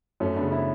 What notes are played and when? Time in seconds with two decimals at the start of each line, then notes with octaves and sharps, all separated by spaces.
0.20 F#2 A3 C#4
0.36 B3 D4
0.42 C#3
0.52 C#4 E4